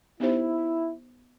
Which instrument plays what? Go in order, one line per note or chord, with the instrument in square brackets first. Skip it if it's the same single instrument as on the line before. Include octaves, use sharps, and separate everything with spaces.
[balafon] B3 D#4 G4 C5 [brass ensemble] E4